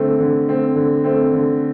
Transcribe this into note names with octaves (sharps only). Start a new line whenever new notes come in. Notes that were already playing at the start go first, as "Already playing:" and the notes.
Already playing: D3 A3 C4
D3
A3 C4
D3
A3 C4
D3